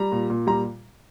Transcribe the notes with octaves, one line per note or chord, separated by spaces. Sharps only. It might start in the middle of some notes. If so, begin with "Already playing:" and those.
Already playing: G3 A#5
A#2
A#2
G3 A#5